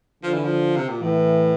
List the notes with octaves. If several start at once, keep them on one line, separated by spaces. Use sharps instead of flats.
D3 F3
E3
F3
C3
A#2
A2 E3